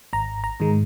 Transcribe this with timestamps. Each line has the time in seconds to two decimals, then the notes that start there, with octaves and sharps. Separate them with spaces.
0.13 G#1 A#5
0.44 A#5
0.60 G#2 D#3 G#3